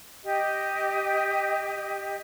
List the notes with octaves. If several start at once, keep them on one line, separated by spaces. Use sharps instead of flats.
G4 D#5